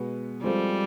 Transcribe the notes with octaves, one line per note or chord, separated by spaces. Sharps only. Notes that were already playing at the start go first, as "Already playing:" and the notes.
Already playing: B2 G#3 B3
F3 G3 G#3 C4 F4 A4